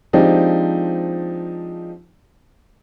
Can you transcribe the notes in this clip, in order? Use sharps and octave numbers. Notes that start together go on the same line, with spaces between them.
F3 G#3 C4 D4 D#4 G4